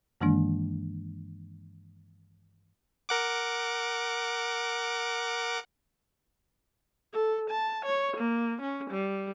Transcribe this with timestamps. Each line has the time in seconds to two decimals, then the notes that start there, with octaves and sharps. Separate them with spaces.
0.21 G2 D#3 E3 G#3 A#3 D4
3.09 A#4 F#5 D6
7.13 A4
7.50 A5
7.85 C#5
8.17 A#3
8.62 C#4
8.90 G3